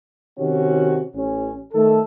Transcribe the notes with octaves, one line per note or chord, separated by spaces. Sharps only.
C3 D#3 C#4 F#4
A1 C#4
D#3 A3 A4